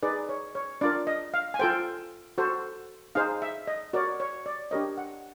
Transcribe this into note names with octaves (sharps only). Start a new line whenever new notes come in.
D#4 G#4 B4 D5
C#5
C#5
D4 F4 A#4 D5
D#5
F5
G#5
F4 A4 C5 G5
F#4 A4 C5
D#4 G#4 C5 F5
E5
D#5
F#4 A#4 C#5 D5
C#5
D5
D4 G4 A#4 C#5 D#5
F#5